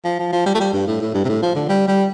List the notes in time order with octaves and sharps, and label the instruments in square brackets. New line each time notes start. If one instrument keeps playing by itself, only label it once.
[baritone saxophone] F3
F3
F3
G3
A3
G3
G2
A2
A2
G2
C3
A2
F3
D3
G3
G3